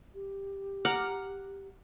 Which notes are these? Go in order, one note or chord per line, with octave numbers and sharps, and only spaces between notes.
G4
F#5 A#5 D6 F6